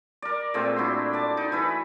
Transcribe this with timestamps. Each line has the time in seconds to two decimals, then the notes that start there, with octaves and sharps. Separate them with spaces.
0.22 A#4 D5
0.54 A#2 G#3 A3 C4
0.76 D4 E4 F#4 C6
1.13 D5 A5
1.37 D#4
1.52 E3 E4 B4